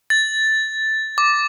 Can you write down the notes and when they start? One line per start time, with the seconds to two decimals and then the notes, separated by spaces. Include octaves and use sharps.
0.10 A6
1.18 D6